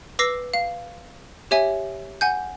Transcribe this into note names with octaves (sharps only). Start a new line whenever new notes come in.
B4 D6 E6 A#6 C7
F5
G4 C#5 E5 G#5
F#5 G#5 G6